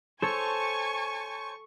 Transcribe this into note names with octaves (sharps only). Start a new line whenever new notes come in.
A4 C5 C#5 G#5 A5 C#6